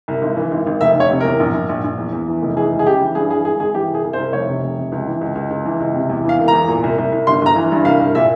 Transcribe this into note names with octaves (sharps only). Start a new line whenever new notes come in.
C2
G#1
E3
G#1
G#1
F1 E5
F1 C#5
C3
E2 A#4
A#1
A#1
A#1
A#1
E2
E2
E3
F1
E3 G#4
C#2
G#4
C#3 G4
E3
G2 G#4
E3 G#4
G#1 G#4
G#1 G#4
E3 G4
C2
G#4
C2
C5
C2
F1 C#5
C3
F1
C3
C#2
E3
C#2
C#2
C#2
E3
C#2
C3
E2
E3 F5
E1
A#5
E2
A#2
C2
C2
C2
G1 C6
G1 A#5
E3
G2
C2 F5
C2
A#2 E5